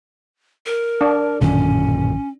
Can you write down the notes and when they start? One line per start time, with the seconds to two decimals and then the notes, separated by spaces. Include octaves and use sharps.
0.66 A#4
1.01 D4
1.41 A1 F#2 A#2 D3 D#3 F#3 C#4